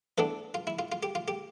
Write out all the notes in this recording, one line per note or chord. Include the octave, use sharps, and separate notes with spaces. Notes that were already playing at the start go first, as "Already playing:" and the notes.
E3 B3 D4 A4
F4
E4
F4
F4
G4
F4
G4